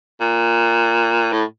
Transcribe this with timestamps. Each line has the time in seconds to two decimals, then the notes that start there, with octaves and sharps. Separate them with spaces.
0.21 A#2
1.33 A2